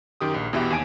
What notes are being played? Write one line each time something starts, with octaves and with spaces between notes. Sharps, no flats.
F#2 D#3 G4 D#6
A#1
E2 B2 E3 B3 G4 E5
D#2 G#5 D7